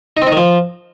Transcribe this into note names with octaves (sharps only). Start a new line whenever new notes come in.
D#4
C4
D#4
D#3
F3